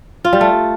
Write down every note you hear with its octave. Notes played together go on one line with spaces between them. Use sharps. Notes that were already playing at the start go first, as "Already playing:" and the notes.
F4
G3
A3